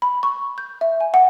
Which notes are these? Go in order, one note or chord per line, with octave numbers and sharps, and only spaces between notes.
B5
C#6
G6
E5
G#5
F#5